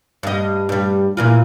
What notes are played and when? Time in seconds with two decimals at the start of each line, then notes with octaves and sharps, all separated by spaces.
0.23 G2 D#5
0.69 G2 G3
1.17 A#2 E3 F4